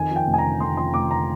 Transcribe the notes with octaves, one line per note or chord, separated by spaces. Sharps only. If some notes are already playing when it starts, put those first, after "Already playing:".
Already playing: F2 D#3 G#5
F3
G5
F1
G#5
A#5
D3
F2 C6
F3 C6
F1 D6
D3 A#5